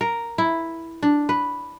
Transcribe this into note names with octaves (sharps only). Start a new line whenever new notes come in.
A#4
E4
D4
B4